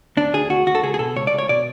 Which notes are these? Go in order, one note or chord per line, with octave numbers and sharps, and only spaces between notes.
D2 D4
D2 G#4
D2 F#4
D2 F#4
A4
C#2 G#4
G#4
B2 A4
C#2 C#5
D5
C#2
C#5
B2 D5